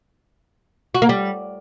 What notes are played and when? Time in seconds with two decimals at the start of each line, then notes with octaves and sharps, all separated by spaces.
0.95 F#4
1.02 A#3
1.09 G3